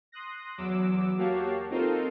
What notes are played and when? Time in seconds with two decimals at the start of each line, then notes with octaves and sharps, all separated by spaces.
0.12 C6 D#6 F#6 A#6
0.58 E2 F#3 D6 E6
1.18 A#3 F#4 G4 C#5 F5 A5
1.70 C4 D#4 F4 A4 A#4 C5